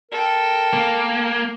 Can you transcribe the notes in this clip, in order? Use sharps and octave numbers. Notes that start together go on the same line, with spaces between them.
A4 A#4 G5
A#3